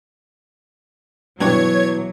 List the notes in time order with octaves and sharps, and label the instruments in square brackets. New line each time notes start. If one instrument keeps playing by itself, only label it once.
[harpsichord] G2 G3 D4 [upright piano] B2 E3 [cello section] F#3 [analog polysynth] C#5 G#6